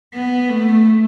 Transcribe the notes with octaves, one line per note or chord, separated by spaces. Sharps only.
B3
A3